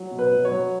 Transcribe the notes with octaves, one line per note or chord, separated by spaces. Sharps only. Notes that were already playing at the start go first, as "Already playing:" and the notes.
Already playing: F#3
B2
B4
F#3
C#5
F#3